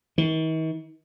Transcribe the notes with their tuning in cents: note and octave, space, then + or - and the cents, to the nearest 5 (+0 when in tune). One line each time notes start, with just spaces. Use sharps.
D#3 +45